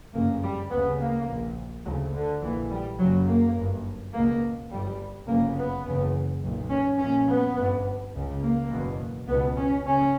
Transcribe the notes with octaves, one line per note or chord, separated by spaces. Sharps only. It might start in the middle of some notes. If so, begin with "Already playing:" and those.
G1 F#2 C#3 A#3
G3
D2 C#3 B3
A#3
A#1 A#2
D2 C#3 F#3
D3
A#1 A#2 E3
G3
F#1 F#2 C#3 F#3
A#3
G1 G2
C#2 B2 A#3
G1 G2 G3
G1 F#2 C#3 A#3
B3
F#1 E2 C#3
B1 A#2
C#4
A#1 A#2 C#4
B3
G1 G2
C#2 C#3
A#3
F#1 E2 B2
C#2 B2 B3
C#4
C#3 C#4